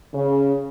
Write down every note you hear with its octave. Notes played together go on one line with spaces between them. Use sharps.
C#3